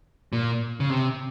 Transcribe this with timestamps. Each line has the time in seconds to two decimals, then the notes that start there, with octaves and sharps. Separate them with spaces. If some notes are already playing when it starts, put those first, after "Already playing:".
0.33 A#2
0.80 C#3
0.90 C3